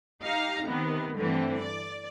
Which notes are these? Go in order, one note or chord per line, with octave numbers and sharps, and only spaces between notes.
D#4 G4 F5 A#5
C3 D#3 B3
G2 D3 E3 A3 C4
D5